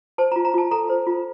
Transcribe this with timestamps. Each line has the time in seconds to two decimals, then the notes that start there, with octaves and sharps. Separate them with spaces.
0.18 C5 A5
0.32 A#5
0.36 F4
0.45 A#5
0.54 F4 A5
0.71 A4 A#5
0.89 C5
1.07 F4